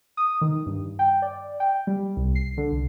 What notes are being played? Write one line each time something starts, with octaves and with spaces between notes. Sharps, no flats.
D#6
D#3
G2
G5
D5
G5
G3
C2
C7
D3
C2